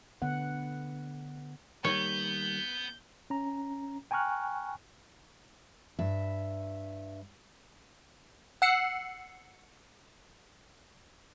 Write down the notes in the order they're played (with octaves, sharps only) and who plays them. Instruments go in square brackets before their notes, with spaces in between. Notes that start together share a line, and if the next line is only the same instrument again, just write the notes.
[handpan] D3 B3 F#5
[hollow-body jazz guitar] D#3 G3 A#3 [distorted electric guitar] B3 [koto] C#5 [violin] G6
[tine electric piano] C#4 A#5
G5 G#5 A#5 C#6 F6 F#6
[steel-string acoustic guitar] G2 E5
[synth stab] F#5 E6 C7 C#7